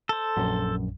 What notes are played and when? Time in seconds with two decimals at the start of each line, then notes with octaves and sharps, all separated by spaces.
0.09 A4 C5
0.37 A#1 F#2